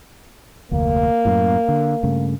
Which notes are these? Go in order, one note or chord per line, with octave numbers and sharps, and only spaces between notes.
F1 D2 A#3
F#2 A2
D3
G2 C#3 A3